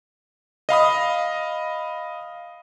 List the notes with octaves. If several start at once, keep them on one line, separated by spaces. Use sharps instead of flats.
D#5 F5 B5 D#6